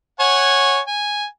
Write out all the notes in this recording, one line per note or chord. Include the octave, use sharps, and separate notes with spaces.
C#5 F#5 G#5
G#5